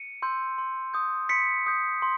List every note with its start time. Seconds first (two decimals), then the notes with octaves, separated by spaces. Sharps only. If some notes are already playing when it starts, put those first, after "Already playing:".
Already playing: C#7 D#7
0.22 C6 E6 G6
0.58 C6
0.94 D#6 G6
1.29 C6 B6 C#7
1.66 D#6 G6
2.02 C6